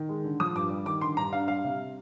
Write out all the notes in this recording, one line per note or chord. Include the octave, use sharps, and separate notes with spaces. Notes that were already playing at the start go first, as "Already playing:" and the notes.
Already playing: D#3
G#3
D3
F3 D#6
G2 D6
G3
D#3 D6
D3 C6
G2 A#5
D4 F5
G3 F5
C3